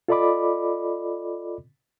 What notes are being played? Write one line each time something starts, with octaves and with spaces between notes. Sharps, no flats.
F4 A4 D5 D#5 B5 D6